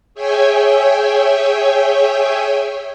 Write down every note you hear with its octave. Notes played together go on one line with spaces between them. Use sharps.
G#4 C#5 E5 G5 G#5